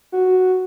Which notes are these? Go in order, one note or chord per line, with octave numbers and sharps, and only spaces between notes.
F#4